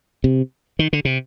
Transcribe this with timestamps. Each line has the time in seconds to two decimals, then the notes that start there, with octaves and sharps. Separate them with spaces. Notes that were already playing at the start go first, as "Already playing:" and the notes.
0.24 C3
0.79 D#3
0.93 D3
1.05 C3